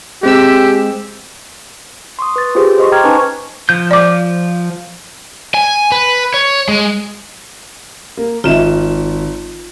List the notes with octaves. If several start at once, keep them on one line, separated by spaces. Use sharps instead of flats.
G#3 C4 G4 E6
C6 C#6 D#6
B4 A6
F4 G4 G#4 C5
C5 D#5 C6 C#6
G5 A#5 D6 F6 G#6
C#4 D#4 B4 G#5 A5 C#6
F3 G6
D5 D6
G#5
B4
C#5
G#3
A#3
G#1 F4 D#5 E5 E7